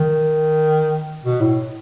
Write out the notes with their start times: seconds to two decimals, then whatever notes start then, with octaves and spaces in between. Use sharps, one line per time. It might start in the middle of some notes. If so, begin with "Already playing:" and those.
Already playing: D#3
1.24 B2
1.41 A2